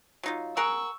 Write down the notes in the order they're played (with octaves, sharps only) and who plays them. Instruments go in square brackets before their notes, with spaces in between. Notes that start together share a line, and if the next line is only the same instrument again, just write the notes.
[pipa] F#3 D#4 F4
[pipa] G#4 A#4 F#5 [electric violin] C#6 E6